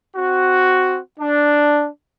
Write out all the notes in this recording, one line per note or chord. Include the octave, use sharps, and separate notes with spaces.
C4 F#4
D4